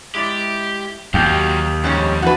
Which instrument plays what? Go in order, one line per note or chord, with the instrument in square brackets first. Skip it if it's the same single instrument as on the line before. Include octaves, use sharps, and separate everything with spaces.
[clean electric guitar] G#3 E4 D5 [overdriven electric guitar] G4
[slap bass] D#2 [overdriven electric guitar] F#3 F5 [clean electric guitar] G4 G5
[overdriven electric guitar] F2 [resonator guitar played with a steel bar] G#2 C#4 C#5 [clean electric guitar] G3
[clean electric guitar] E3 D4 [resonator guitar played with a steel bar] F#4 B4